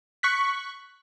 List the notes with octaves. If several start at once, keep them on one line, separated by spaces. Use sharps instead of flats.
C#6 F#6 B6